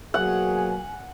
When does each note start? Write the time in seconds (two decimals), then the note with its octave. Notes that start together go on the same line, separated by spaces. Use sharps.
0.14 B2 F#3 A#3 G#4 F#5 G#5